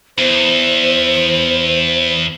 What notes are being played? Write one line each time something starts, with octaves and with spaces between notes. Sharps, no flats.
E2 C5